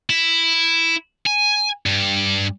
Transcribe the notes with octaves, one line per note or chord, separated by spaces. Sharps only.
E4
G#5
G2